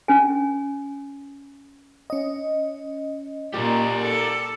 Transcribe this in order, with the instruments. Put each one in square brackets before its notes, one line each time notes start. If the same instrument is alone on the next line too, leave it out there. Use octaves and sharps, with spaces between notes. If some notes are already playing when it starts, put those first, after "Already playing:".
[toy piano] C#4 G#5
[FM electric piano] C#4 D#5
[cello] A#2 [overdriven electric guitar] G4 A#4 [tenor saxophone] D5
[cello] A4